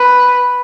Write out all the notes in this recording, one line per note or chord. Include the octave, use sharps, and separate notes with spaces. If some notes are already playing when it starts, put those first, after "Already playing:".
Already playing: B4